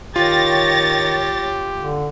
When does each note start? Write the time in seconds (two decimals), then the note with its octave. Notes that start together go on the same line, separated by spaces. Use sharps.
0.16 D#3 F4 G4 C#5 A6 A#6
1.78 D3